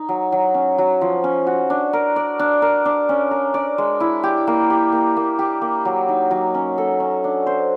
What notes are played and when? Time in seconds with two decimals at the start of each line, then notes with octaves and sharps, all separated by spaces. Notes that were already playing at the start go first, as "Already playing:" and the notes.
Already playing: D#4
0.09 F#3
0.32 F#3
0.54 C#4
0.78 F#3
1.01 F3
1.24 C#4
1.47 F#4
1.70 D4
1.93 A#4
2.16 D5
2.39 D4
2.62 A#4
2.85 D4
3.09 C#4
3.31 A#4
3.54 D5
3.78 G#3
4.00 E4
4.24 G4
4.47 A#3
4.70 G4
4.92 A#3
5.17 A#3
5.39 G4
5.61 A#3
5.85 F#3
6.09 D#4
6.31 F#3
6.54 C#4
6.78 A4
7.00 C#4
7.24 D4
7.46 C5